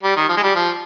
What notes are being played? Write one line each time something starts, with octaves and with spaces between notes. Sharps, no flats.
G3
D#3
F3
G#3
G3
F3